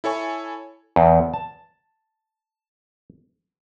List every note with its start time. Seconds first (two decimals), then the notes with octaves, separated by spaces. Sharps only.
0.04 E4 A4 C#5 G#5 C#6
0.96 E2
1.34 A5